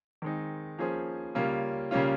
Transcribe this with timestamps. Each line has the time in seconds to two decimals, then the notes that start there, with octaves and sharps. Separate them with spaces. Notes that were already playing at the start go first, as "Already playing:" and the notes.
0.22 D#3 G#3 C4 D#4
0.79 F3 A#3 C#4 G#4 C5
1.35 C#3 G3 A#3 C#4 F4
1.91 C#3 G3 A#3 C#4 F4